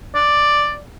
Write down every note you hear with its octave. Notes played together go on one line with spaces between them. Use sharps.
D5